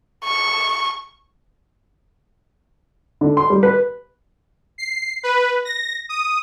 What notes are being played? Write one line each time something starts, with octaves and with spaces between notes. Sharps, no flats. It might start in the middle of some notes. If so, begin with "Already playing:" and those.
C#6
D3
C6
G3
B4
C7
B4
A#6
D#6